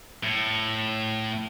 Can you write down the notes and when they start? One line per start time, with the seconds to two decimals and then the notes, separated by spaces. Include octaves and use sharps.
0.23 A2